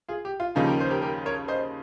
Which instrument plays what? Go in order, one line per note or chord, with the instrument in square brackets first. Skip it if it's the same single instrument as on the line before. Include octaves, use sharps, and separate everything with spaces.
[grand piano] F4 G#4
G4
F4
[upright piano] D#2 C#3 F3 A#3 D#4 [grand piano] F4 G#4
[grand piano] G4 A#4
C5
G4 A#4
G4 A#4
A#4 C#5
C5 D#5